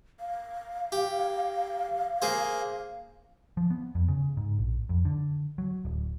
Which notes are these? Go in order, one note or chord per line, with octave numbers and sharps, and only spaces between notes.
F5
G4
A#3 G#4 C5
F3
B3
F2
C#3
G#2
A#1
F2
D3
F#3
D1